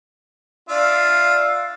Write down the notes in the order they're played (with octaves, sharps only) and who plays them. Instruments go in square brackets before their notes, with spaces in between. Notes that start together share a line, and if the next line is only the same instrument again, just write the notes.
[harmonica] D4 F4 E5 [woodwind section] D5 F5